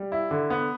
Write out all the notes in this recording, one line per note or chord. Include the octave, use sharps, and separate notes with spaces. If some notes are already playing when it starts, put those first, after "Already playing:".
Already playing: G3
E4
D3
B3